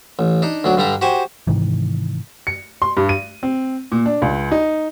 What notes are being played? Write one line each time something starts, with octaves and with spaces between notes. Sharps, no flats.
A1
D4 D#4
D2 F#3 D4
G2 D3 G3 D4 A#5
F#4 G4 C5 G#5
G#2 C3 D#3 E3
C#7
C6
G2
D#7
C4
A#2
D4
C#2
D#4